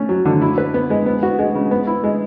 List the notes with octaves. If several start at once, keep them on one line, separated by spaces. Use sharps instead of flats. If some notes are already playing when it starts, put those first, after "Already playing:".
Already playing: A3 C#4
F#3
D3
E4
B4
B3
G#3
B3
F#4
G#3
C#3
B3
E4
G#3